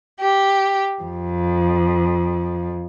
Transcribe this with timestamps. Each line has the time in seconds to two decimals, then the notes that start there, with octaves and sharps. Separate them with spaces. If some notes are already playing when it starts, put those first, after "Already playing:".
0.20 G4
1.03 F2